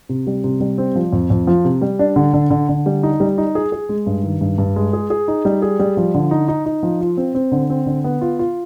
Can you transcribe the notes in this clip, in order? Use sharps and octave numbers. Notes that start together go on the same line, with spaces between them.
C3
G3
C3
G3
C4
F3
F2
F2
F3
C3
G3
D4
D3
D3
D3
D3
G3
D#4
G3
D#4
G#4
G#4
G#3
G2
D#3
G2
G2
G#3
G#4
G#4
D#4
G3
G#4
G3
F3
D3
D#4
D#4
D#4
F3
F4
C4
C4
D3
C4
D3
B3
F4
F4